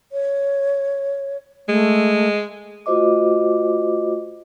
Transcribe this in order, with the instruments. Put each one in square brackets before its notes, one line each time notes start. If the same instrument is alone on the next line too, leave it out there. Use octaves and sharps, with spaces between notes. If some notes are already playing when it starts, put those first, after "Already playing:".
[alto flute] C#5
[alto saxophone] G#3 [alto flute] A3
[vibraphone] A3 F4 F#4 C5 D#5 D6